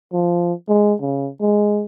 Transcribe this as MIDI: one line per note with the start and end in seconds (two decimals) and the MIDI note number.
0.13 0.53 53
0.69 0.94 56
1.01 1.29 49
1.41 1.85 56